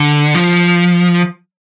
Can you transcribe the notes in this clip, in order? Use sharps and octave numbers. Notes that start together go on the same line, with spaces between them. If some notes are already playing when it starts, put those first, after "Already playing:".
Already playing: D3
F3